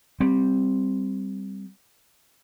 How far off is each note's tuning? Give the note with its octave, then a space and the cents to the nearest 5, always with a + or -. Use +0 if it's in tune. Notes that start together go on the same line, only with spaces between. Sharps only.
G3 +0 C4 +0